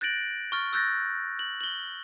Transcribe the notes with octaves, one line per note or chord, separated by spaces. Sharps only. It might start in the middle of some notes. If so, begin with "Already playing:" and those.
F#6 G6 A6 A#6 D7 F#7
C#6 F6 A6
E6 F#6 G6 A6 A#6
F#7
F#7 G7